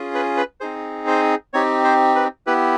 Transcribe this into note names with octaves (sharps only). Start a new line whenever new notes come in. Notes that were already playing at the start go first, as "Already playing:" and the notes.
Already playing: C#4 F4 G#4
B4
B4
C4 D#4 G#4 C5
C5
C4 D#4 G4 C#5
C5
B4
B3 E4 G4 B4